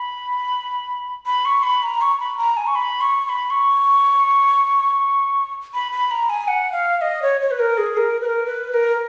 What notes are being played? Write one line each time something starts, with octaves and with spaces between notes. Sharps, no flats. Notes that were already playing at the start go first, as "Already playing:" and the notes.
Already playing: B5
B5
C#6
B5
A#5
C#6
B5
A#5
G#5
C#6
B5
C#6
C#6
B5
C#6
B5
B5
A#5
G#5
F#5
F5
F5
D#5
C#5
C#5
B4
A#4
G#4
A#4
B4
A#4
B4
B4
A#4